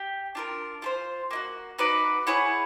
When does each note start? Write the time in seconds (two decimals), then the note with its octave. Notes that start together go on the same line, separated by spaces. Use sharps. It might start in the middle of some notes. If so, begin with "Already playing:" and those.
Already playing: G4
0.35 D4 F4 A#4
0.82 F4 A4 C5
1.31 A#3 D#4 F#4
1.78 D#4 F#4 B4 D5
2.27 E4 G#4 C#5 F#5